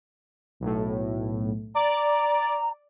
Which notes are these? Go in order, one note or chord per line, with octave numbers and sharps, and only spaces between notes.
B1 A2
D5 A#5